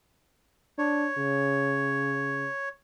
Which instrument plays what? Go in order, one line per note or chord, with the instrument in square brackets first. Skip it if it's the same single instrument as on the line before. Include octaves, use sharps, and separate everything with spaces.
[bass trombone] D4 [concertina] C#5
[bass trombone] C#3